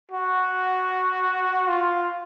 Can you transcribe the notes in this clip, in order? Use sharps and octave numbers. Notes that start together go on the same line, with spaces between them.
F#4
F4